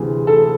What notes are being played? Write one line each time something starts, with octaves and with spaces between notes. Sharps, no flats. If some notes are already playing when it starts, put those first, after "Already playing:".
Already playing: D2 C3 E3 G#4
A4